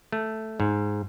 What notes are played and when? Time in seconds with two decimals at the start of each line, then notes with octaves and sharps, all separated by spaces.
0.12 A3
0.60 G#2